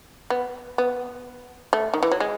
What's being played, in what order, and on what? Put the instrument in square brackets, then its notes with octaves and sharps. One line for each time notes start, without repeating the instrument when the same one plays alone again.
[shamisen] B3
B3
A3
D#3
E3
F#3
G#3